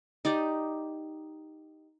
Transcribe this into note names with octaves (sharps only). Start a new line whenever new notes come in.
D#4 G4 D5